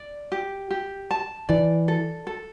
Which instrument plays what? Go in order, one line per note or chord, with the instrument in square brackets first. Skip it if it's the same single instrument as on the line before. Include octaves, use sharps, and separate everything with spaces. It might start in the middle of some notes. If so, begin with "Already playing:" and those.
Already playing: [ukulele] D5
G4
G4
A5
[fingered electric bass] E3 [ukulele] D5
[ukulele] A4
A4